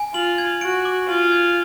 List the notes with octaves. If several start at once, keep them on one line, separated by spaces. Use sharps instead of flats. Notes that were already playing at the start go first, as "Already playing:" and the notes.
Already playing: G#5
F4 F#7
G#6
F#4 D7
D6
F4 F#7
G#6